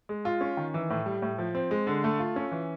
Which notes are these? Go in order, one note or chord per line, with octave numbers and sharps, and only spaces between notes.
G#3
F4
C#4
D#3
E3
A2
G3
A2
F3
C4
G#3
D3
A3
F4
C#4
E3